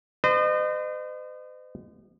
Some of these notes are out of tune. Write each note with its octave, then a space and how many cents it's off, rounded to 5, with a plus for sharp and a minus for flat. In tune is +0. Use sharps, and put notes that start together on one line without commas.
C5 -45 D#5 -35